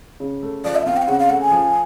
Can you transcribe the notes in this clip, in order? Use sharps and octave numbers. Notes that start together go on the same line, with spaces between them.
C#3
A3
F3 D5
E5
C4 F5
G5
F5
C#3 F#5
F5
A3 F#5
G#5
F3